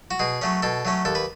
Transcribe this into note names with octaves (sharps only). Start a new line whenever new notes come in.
F#4
B2 G#4
F#3 A3 C#4
B2 A4
F#3 A3 C#4
D#2 A4
B4